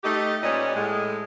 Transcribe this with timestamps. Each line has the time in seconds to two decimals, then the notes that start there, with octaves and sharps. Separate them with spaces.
0.04 A3 D#4 G4
0.43 A#2 G3 C#4 B4 D5 D#5
0.74 A2 G#3